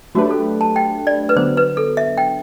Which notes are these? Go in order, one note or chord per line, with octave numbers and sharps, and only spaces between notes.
F#3 A3 D4 F#4 G4 B4
A4
A5
G5
D5
B4
D3 F#3 B3 C5
B4
A4
E5
G5